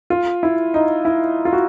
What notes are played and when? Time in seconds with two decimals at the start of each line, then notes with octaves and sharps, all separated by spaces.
0.10 F4
0.43 E4
0.74 D#4
1.05 E4
1.45 F4
1.53 F#4